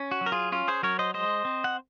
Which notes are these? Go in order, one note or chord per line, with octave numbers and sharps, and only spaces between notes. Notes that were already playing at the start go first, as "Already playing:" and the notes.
Already playing: C#4
F#4
F#3
A#4
F4 G#4
C#4 F4
G#4 C5
F#3 A#4 C#5
C5 D#5
G#3 C5 D#5
C4
F#5